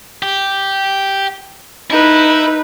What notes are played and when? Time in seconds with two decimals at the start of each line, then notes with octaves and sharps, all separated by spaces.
0.23 G4
1.90 D#4 E4 B4